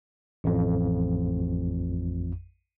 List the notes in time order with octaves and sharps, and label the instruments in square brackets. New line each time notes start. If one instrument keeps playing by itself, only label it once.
[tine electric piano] A1 F2